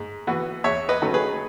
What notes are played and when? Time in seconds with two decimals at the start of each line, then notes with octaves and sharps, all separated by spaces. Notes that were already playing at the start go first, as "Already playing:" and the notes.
Already playing: G#2
0.27 E3 B3 F#4
0.64 E2 C#5 E5
0.89 B4 D#5
1.02 D#3 F#3 A3 C#4
1.14 G#4 B4